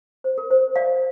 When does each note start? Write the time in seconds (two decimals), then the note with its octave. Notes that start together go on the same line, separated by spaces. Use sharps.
0.24 C5
0.38 A#4
0.51 C5
0.76 D5 F5